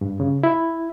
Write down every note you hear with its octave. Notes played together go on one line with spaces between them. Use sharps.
G2
C#3
E4